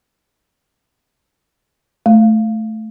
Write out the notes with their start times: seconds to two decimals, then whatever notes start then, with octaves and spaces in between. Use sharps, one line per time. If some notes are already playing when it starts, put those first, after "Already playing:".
2.06 A3